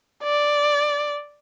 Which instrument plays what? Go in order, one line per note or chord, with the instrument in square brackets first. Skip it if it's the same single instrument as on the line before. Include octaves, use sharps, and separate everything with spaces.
[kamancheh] D5